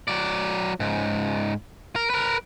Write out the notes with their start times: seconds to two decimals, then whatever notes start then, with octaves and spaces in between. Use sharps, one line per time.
0.08 F#3 D5
0.80 C#2 G#2
1.96 A#4
2.10 A#4 B4